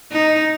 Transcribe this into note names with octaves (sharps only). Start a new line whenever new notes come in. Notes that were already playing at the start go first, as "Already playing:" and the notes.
D#4